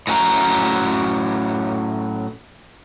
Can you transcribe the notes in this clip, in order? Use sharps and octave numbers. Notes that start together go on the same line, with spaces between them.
A2 F#3 C#4 A5 A#5